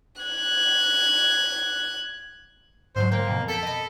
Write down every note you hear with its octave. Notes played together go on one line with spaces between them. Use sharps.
F#6 G#6
G#2 D3 F#3 C5
A#3 G5
F2 B2
A4 G6 B6 D7
D#5 B5